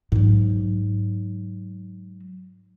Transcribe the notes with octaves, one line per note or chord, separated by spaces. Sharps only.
G#2 F#3